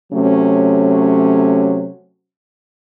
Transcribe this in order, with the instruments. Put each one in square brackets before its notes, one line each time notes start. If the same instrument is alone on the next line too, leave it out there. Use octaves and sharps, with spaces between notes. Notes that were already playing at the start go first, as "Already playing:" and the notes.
[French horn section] C3 F#3 A3 C#4